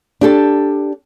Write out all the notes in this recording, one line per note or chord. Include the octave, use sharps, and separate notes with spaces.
D4 G4 A4